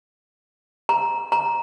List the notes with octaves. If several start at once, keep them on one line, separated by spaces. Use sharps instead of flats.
A#5
A#5